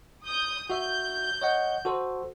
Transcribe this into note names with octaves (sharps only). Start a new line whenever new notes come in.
D#6 G6
F#4 E5 G6
C#5 D#5 F#5
F#4 A4 C5